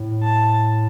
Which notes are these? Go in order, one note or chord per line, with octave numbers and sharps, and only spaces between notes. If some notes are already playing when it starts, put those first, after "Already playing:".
Already playing: A2
A5